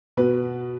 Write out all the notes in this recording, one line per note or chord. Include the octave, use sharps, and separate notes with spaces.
B2 B4